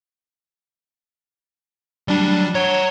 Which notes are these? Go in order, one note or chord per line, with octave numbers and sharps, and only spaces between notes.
F#3 G3 D4 D5
C#5 F#5 A#5